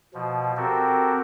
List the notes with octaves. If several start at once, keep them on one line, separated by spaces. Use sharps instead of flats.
B2 F3
C4 F#4 G4 A4 A#4